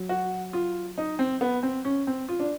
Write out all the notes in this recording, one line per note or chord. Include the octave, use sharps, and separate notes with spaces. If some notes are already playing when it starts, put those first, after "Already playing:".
Already playing: F#3
F#4
F4
D#4
C4
B3
C4
C#4
C4
F4
D4